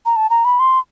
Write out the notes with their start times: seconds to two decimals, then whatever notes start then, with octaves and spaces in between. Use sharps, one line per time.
0.06 A#5
0.16 A5
0.30 A#5
0.45 B5
0.60 C6